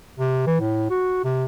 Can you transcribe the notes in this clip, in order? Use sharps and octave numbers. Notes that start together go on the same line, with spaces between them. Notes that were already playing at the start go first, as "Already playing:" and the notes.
C3
E3
A2
F#4
C3